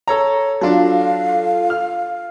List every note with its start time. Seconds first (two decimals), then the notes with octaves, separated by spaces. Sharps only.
0.08 A4 C#5 A#5
0.61 F#3 D4 F4 A4 F5
1.70 F6